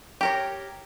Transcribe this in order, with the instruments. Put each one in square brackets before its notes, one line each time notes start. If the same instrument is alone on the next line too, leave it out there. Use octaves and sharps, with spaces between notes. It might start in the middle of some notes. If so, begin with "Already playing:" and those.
[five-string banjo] G4 A#4 C#5